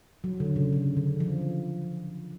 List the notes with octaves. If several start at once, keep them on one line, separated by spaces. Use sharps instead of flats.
F#3
D3
C#3
C#3
D3
F3